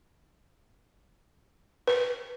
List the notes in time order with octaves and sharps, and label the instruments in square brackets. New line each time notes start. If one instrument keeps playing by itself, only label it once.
[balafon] B4